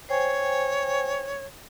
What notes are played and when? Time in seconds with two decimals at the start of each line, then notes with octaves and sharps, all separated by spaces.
0.09 C5 C#5 G5 G#5